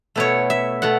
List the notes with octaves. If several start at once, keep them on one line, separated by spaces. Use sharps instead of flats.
B2 A3 E4 C#5
E5
B2 A3 F#5